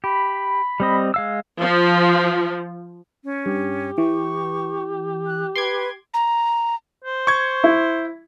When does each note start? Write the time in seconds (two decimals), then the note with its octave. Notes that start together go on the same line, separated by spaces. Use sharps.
0.04 G4 B5
0.80 G3 C4 D#5
1.14 G#3 F5 E6
1.61 F3
3.25 C#4
3.46 G2 G4
3.98 E3 C#6
5.27 F#6
5.56 B4 C6 D6 G#6
6.14 A#5
7.05 C5
7.27 C#6 G#6
7.64 E4